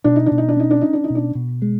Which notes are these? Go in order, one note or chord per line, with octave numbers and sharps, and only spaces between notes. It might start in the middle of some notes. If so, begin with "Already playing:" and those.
B2 D4
D#4
D4
B2
D#4
D4
C#4 D#4
D4
C#4 D#4
D4
D#4
B2
D4
B2
G#3